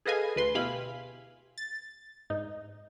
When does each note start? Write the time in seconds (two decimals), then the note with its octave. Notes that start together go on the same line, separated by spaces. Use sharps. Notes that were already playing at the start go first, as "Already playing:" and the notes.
0.06 G#4 A4 B4 D#5 F5 G#5
0.36 D2 B4 C6
0.55 B2 E4 G4 F5 G#5 B5
1.58 A6
2.30 G#2 D#4